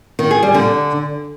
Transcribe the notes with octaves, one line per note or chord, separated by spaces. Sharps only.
D#3
G#4
G3
D3